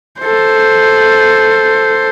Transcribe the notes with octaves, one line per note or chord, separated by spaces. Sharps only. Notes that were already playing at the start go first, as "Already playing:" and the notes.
A4 C5